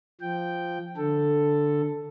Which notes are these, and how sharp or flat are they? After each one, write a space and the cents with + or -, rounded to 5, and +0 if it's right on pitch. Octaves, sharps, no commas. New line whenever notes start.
F3 -5 G5 -5
D3 +0 A4 +5